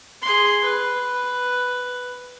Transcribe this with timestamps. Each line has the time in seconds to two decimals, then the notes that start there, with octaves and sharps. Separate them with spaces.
0.22 G#4 C6
0.63 B4